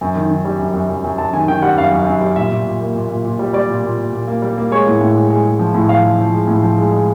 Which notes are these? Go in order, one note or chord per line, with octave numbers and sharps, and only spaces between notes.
F#2
D#3
D#3
G3
F#2
F#2
F#2
F#2
F#2 A5
D#3 G#5
D#3 G5
G3 F#5
F#2 F5
F#2
F#2
G3
A#2 E5
A#2
A#2
A#3
A#2
A#2
A#2
G3
G3 D5
A#2
A#2
A#2
A#2
A#3
G3
A#3
G#3 C#5
A2
A2
G#3
G#3
G#3
F3
A2
F3 F5
F3
F3
G#3
A2
F3
G#3
G#3